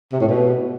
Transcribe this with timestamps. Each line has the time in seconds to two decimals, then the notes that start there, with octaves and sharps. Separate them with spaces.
0.12 C3
0.20 A2
0.28 B2